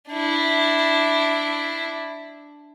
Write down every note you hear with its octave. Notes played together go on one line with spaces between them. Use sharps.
D4 E4